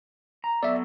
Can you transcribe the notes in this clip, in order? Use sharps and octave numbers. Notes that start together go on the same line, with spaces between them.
A#5
F#3 B3 A4 D5 E5